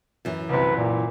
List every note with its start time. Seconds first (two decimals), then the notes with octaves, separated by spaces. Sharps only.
0.25 F#2 E3
0.49 C2 C3 B4
0.76 A#2